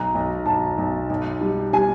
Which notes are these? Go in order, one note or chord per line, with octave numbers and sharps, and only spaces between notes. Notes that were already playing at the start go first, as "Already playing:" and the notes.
Already playing: B1 A#5
B1
B1 A5
B1
B1
G3
G3 G#5